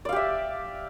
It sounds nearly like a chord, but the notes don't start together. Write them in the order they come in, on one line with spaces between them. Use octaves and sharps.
D5 F5 G4 E5